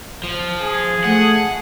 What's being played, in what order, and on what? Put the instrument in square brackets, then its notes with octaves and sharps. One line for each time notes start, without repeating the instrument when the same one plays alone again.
[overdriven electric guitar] F3
[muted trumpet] G#4
[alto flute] A3 [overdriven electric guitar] F#5